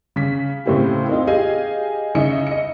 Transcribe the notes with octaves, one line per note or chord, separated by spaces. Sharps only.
C#3 B6
A2 C#3 C4 E4 G4
C4 D#4 F4
G4 G#4 D#5 F5 G#5
C#3 D#4 E5 C#7
D#5 C#7